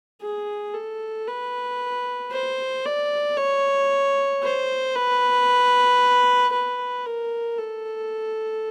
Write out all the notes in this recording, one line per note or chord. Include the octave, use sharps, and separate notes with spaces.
G#4
A4
B4
C5
D5
C#5
C5
B4
B4
A#4
A4